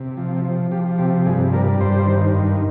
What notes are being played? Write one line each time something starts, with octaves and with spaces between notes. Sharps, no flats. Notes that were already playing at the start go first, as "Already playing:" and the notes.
Already playing: C3
F3
F3
F3 G4
C3 G4
G2 G#4
G3 A#4
G2 C5
D#3
G2